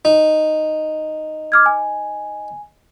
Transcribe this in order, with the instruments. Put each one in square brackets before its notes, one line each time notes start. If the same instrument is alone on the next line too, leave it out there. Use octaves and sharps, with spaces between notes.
[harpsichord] D#4
[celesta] D6 F6 G#6
G#5